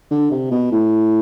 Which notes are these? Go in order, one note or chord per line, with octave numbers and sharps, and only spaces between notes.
D3
C3
B2
A2